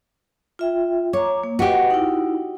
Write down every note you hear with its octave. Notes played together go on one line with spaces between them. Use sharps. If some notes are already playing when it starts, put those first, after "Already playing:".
F4 E5 G5
C#5 A#5 D6
A#3
F#4 G4 B4 D#5
D#4 E4